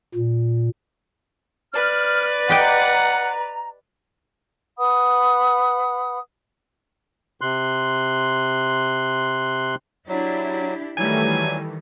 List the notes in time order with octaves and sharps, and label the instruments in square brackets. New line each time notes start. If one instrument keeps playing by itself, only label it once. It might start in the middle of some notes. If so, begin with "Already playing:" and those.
[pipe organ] A#2
[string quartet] B4 D5 [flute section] F6
[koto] G4 D#5 G5 [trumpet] F#5 [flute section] A#5
[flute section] B4 F#5 B5 D#6
[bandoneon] C3 C6 F#6
[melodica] F#3 [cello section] D4 E4 G4
[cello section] D#3 [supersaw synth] E3 G3 A3 [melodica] F#3 [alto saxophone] G#5